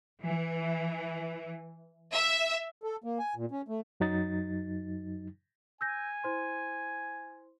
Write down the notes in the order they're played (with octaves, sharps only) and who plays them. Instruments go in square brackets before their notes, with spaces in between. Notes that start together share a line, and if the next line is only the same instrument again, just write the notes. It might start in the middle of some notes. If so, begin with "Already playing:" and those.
[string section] E3
E5
[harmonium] A4
A#3
G#5
A#2
C#4
A3
[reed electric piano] F#2 F#3 D#4 A6
[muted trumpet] G#5 [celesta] E6 G6 A#6
[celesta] E4 C5 C6